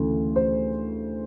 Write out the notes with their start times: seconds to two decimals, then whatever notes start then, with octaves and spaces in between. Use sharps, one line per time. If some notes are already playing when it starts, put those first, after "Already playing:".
Already playing: D2 C#3 E3 A3
0.36 C5